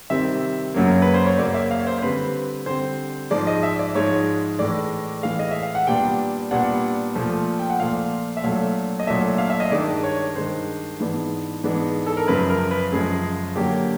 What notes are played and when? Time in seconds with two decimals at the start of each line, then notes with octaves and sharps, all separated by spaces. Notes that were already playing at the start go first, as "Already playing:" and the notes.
0.10 C3 D#3 G3 C4 E5
0.74 F#2 C#3 F#3 A#3
1.02 B4
1.14 C5
1.27 C#5
1.38 F#2 C#3 F#3 A#3 D5
1.54 E5
1.71 F5
1.80 C#5
1.87 C5
1.98 C5
2.02 D3 G3 C4 B4
2.66 D3 G3 C4 C5
3.31 G#2 F3 G#3 D5
3.47 D#5
3.63 E5
3.79 D5
3.95 G#2 F3 G#3 C#5
4.59 A2 E3 G#3 D5
5.23 A2 E3 G#3 F5
5.39 D#5
5.51 E5
5.62 F5
5.75 F#5
5.87 A#2 G3 B3 D4 G5
6.51 A#2 G3 B3 D4 F#5
7.15 A#2 F3 A3
7.59 G5
7.70 F#5
7.80 A#2 F3 A3 F5
8.37 E5
8.44 A#2 F#3 A3 D4 F5
8.99 D#5
9.07 A#2 F#3 A3 D4 E5
9.38 F5
9.50 E5
9.60 D#5
9.71 G2 D#3 G#3 D5
10.03 C#5
10.36 G2 D#3 G#3 C5
11.00 G#2 E3 G#3 B3 D4
11.63 G#2 E3 G#3 B3 D4
12.06 A4
12.17 A#4
12.28 F#2 C#3 F3 G#3 B4
12.50 A#4
12.71 B4
12.92 F#2 C#3 F3 G#3 G#4
13.56 D3 F#3 A#3 D4 G4